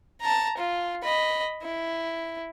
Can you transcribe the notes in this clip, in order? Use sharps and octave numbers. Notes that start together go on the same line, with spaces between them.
A5 A#5
F4
D#5 B5
E4